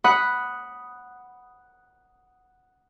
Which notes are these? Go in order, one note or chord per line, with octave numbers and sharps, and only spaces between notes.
F#5 B5 D#6